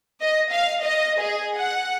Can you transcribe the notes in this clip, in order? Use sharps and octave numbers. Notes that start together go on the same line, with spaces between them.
D#5
F5
D#5
G#4
F#5